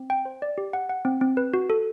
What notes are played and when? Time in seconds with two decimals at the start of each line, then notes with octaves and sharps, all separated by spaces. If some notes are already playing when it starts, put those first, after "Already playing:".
Already playing: C4
0.10 G5
0.25 C5
0.42 D5
0.58 G4
0.73 F#5
0.89 F#5
1.05 C4
1.21 C4
1.37 B4
1.54 F#4
1.70 A4